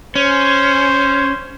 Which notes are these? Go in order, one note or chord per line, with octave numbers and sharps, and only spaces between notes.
C#4 C5